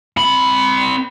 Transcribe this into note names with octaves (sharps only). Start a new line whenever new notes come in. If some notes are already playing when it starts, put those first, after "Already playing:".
C4 B5